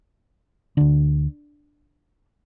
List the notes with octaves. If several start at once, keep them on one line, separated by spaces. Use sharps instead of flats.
D2 D3 D4